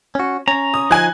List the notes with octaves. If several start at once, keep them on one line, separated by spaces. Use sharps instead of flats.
C#4 F#4
C#4 A#5
D#6
F3 D#4 G#5 F#6